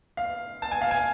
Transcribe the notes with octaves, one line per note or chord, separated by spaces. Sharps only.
F5
A5
G#5
F5
G#5